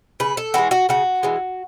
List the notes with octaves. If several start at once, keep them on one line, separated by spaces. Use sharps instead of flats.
C#3 B4
A4
E3 G#3 F#4
F#4
C#3 F#4
E3 G#3